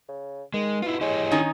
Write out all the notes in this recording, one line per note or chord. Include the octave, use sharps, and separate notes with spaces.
C#3
D#3 G#3
B2 E4 F4
G#3 E4 G4 C#5
D#3 C#4 D#4